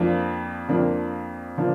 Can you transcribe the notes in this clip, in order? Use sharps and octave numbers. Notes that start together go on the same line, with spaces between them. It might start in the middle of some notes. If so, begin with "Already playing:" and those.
Already playing: F2 F3 A#3 D4
F2 F3 A#3 D4
F3 A#3 D4